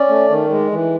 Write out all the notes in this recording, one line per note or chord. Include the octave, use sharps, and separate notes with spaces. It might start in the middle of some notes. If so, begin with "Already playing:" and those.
Already playing: C#4 D5
A3
D#3
G#3
E3